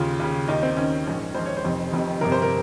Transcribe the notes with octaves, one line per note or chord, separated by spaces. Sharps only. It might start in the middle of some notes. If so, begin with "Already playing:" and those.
Already playing: D#2 C#3 F4
D#2 C#3
D#2 D#3 D#4
C4
D#2 D#3 C#4
A#1 G#2 D#3
A#1 G#2 D#3 C5
C#5
C5
F1 F2 C3 D#3
F1 F2 C3 D#3
G1 F2 C3 A#4
C5
A#4